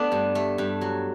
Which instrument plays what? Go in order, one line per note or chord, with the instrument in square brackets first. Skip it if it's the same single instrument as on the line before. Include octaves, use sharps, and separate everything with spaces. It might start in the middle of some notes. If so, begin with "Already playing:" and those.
Already playing: [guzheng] A3 B3 D4
G2
A3
G2
F#3